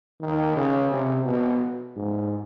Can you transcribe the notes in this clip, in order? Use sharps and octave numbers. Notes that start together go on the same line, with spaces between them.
D#3
C#3
C3
B2
G#2